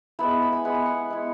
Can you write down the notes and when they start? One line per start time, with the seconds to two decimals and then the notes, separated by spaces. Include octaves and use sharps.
0.19 G#3 B3 E4 B5
0.42 B5
0.53 G#5
0.65 G#3 B3 E4 F#5
0.75 G#5
0.86 F#5
1.10 G#3 B3 E4